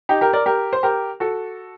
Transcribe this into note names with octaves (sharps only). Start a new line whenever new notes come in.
D#4 G4
G4 A#4
A#4 D5
G4 A#4
C5
G4 A#4
F#4 A4